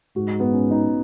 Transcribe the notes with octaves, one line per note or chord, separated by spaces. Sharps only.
G#2 F#4
D#4
B3
C#4
D#4